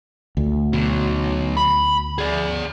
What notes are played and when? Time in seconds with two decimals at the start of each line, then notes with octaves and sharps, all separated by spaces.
0.37 D2
0.73 B2 F#3
1.57 B5
2.18 G#4 D5